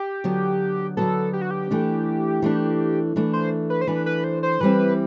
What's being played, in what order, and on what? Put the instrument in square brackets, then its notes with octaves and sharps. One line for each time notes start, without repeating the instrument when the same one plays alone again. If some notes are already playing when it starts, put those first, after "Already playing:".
Already playing: [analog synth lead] G4
[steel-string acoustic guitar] D3 F#3 B3
[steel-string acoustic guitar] D3 F#3 B3 [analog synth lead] A4
[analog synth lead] G4
F#4
G4
[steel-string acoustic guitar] E3 A3 D4
E3 A3 D4
E3 A3 D4
[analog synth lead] C5
B4
C5
[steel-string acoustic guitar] E3 A3 D4 [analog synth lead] B4
[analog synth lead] B4
C5
C5
[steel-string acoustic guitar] E3 G3 C4 E4 [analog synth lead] B4